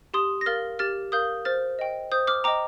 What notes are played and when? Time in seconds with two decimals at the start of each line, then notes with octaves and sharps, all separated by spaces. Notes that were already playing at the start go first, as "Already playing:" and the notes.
0.14 G4 C6 D#6
0.41 A#6
0.46 A#4 F5 F6 A6
0.79 G4 F6 A6
1.12 A#4 F5 D#6 G6
1.45 C5 F6 A6
1.79 D#5 G5
2.12 C5 D#6 G6
2.27 D6 F6
2.44 D#5 G5 A#5 D6